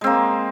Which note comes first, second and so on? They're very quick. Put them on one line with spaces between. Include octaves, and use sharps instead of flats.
G#3 C4 A#3